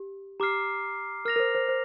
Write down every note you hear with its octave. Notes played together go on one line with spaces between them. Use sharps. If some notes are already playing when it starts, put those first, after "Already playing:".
Already playing: G4
G4 A#5 D6 F6 C7
A#4 F6 A#6 F7
A#4
C5
C5
C5